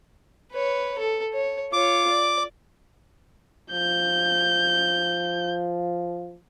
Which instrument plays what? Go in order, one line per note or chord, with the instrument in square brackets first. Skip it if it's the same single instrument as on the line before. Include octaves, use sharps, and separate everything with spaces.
[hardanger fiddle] B4 C#5
A4
C#5
[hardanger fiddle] F4 C#5 [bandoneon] D6
[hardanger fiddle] D5
[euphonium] F3 [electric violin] G6